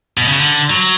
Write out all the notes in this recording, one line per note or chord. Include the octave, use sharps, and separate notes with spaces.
B2
C#3
D3
F#3